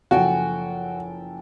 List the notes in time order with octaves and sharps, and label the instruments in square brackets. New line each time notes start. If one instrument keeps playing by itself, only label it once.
[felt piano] F#1 F3 [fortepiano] F#4 [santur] A4 G5 G#5